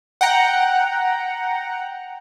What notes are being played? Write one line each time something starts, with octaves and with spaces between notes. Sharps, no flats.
F#5 G5 A#5